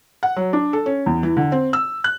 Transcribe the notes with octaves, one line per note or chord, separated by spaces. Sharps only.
F#5
F#3
D4
A4
C#4
E2
E3
D3
C4
E6
F#6